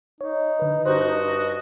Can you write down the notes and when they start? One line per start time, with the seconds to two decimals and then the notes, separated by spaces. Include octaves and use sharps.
0.21 D#4 C#5
0.59 D3 B4
0.86 G2 F#4 C5 D#5